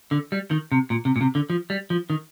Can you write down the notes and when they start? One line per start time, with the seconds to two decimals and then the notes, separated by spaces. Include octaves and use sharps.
0.11 D3
0.32 G3
0.51 D#3
0.72 C3
0.90 A#2
1.05 C3
1.16 A#2
1.21 C3
1.35 D3
1.50 F3
1.70 G3
1.90 F3
2.10 D#3